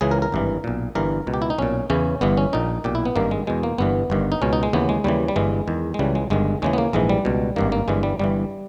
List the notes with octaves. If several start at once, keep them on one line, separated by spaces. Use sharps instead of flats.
C#2 C#3 E3 G#4
A#4
A#4
G#1 G2 E3
B1 A#2
G1 G2 E3 A#4
C#2 B2
G4
E4
D#4
B1 A#2 C#4
E2 C#3 E3 C#4
G1 G2 E3 B3
C#4
A#1 A#2 D#4
B1 A#2 G4
E4
B3
G#1 G2 D#3 A#3
G#3
E2 B2 G#3
A#3
G1 G2 E3 B3
G1 G2 D#3
D#4
C#2 B2 C#4
D#4
G#3
D#2 C#3 E3 B3
G#3
D#2 C#3 E3 G3
G3
G1 G2 E3 G#3
E2 D#3
G#3
C#2 C#3 E3 G3
G#3
G1 G2 D#3 G#3
D#2 C#3 E3 G#3
B3
A#3
A#1 G#2 E3 G#3
G3
C#2 B2
G#1 G2 D#3 A#3
A#3
G1 G2 E3 G#3
G3
G1 G2 E3 G3